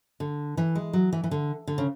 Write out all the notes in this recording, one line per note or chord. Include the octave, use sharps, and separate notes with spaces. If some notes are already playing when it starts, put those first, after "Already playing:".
D3
E3
G#3
F#3
E3
E3
D3
D3
C#3